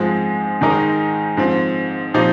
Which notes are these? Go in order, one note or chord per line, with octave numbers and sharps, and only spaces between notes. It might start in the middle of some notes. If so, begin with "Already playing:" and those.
Already playing: G#2 F3 G#3 C4
G#2 D#3 G#3 D#4 A#4
G#2 F3 C4
A#2 F3 C4 D#4 G4